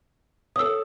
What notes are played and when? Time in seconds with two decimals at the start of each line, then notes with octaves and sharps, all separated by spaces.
0.56 A4 C#5 D#6 E6